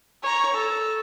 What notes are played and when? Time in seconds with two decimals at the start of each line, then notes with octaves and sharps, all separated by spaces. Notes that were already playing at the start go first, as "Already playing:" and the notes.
0.23 C#5 A#5
0.54 A4